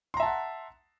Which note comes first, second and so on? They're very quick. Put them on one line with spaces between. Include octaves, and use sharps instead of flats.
C6 A#5 E5 A5 F#5